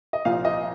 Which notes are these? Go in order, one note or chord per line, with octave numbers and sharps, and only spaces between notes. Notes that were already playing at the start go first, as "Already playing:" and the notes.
D#5
C2 A#2 F3 F5
D#5